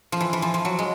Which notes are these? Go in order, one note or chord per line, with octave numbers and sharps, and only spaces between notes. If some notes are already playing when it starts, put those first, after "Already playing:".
F3
E3
E3
F3
F3
F#3
G#3